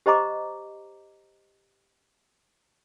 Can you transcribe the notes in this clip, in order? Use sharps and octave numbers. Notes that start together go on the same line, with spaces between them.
G4 C5 D#5 A#5 D6